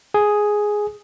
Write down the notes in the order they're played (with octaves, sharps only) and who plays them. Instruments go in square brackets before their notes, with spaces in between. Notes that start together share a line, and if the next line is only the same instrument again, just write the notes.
[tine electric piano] G#4